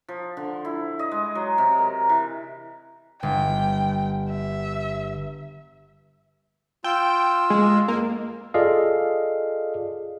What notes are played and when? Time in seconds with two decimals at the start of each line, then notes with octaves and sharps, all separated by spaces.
0.08 F3
0.37 D3
0.65 E4
0.99 D#5
1.12 G#3
1.35 F#3
1.58 C3
1.78 A#4
2.09 E3
3.23 G1 G5
4.29 E5
6.84 F4 G5 E6
7.50 G#3
7.88 F2 A#3
8.54 F4 G#4 A4 D5 D#5 F5